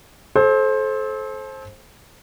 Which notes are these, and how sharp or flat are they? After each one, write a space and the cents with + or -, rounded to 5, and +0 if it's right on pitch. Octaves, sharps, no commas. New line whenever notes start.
A4 -30 C5 +20